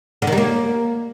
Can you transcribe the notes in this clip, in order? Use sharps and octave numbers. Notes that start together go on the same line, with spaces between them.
D3
D#3
G3
A#3